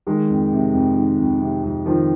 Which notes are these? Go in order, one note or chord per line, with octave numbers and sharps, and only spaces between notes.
D#3 G#3
F2
C3
F2
D#3
F2
C3
F2
D#3 F3